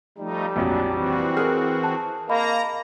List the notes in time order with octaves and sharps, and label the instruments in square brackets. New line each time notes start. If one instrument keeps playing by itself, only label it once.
[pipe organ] F3 A3 D#4 [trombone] G3
[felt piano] A#1 F2 F#3 [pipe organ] D4
[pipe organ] E3 C4 F#4
[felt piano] G#4 A#4 [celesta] F6
[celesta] A5
[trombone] A#3 [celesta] D#5 F5 B5 [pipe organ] A#5